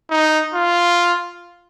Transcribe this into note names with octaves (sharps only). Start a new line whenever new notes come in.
D#4
F4